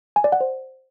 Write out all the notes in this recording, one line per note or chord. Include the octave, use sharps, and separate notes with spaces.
G#5
D5
F#5
C5